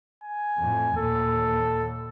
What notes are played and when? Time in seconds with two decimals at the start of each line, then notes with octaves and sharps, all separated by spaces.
0.23 G#5
0.58 F2 A2
0.97 D#2 A#2 A4